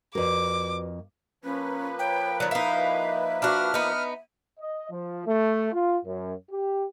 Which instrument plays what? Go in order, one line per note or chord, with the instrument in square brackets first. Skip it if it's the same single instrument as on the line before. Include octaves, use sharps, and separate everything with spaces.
[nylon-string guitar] F2 A#3 [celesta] F#4 B4 D5 [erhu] D6
[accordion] F3 A#3 B4 [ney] C#4
[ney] C#5 [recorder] G5
[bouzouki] D#3 F#3 [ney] D5
[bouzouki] D#4 E4 [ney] E5 [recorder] F5
[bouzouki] D4 F#4 [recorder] F6
[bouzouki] B3 D#4
[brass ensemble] D#5
F3
A3
F4
F#2
G4